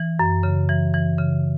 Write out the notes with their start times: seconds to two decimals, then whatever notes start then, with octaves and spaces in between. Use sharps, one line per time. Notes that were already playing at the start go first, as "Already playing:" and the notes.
Already playing: E3
0.19 F#2
0.43 C#3
0.69 E3
0.94 E3
1.18 C#3